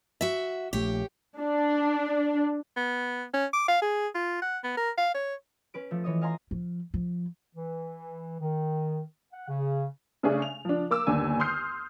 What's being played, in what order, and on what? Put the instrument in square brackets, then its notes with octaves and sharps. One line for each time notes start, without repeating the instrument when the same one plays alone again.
[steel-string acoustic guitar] F#4 E5
[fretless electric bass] A#1 A3 [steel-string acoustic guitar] G4 C#5
[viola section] D4
[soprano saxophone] B3
C#4
D6
F5
G#4
F4
F#5
B3
A#4
F5
C#5
[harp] C#4 B4 D7
F3 A3
E3 C#5 D#5 D#6
D#5 F5 G#5 A#5 C6
[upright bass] F3
F3
[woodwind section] E3
D#3
F#5
C#3
[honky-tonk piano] C#3 A3 D4 G#4
F7
F3 D4
A#3 D6 E6
G1 D#2 D4 G#5
C6 D#6 F6 G6 C7